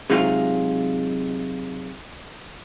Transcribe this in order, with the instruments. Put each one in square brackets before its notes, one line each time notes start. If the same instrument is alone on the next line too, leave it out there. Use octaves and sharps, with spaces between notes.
[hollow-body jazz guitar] C3 F#3 G#3 D#4 F4